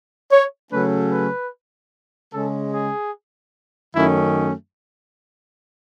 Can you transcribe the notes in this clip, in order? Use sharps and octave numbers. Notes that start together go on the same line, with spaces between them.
C#5
C#3 F#3 A3 C#4 B4
B4
C#3 G#3 C#4 A4
G#4
F#2 D#3 A3 C#4 E4